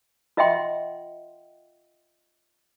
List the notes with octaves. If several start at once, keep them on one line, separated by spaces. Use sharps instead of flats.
F4 D#5 E5 F#5 G5 C6